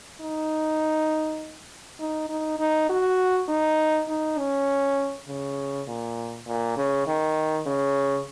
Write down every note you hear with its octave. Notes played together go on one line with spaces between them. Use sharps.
D#4
D#4
D#4
D#4
F#4
D#4
D#4
C#4
C#3
A#2
A#2
C#3
D#3
C#3